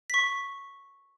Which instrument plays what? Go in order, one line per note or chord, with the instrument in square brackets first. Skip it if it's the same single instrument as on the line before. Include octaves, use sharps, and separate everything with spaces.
[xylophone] C#6 B6